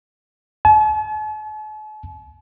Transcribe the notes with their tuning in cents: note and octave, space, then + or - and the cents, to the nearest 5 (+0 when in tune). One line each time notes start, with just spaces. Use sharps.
A5 -45